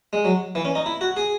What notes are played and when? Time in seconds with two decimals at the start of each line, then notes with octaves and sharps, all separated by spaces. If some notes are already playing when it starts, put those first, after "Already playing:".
0.13 G#3
0.25 F#3
0.55 E3
0.65 C#4
0.75 D#4
0.86 E4
1.01 F#4
1.17 G#4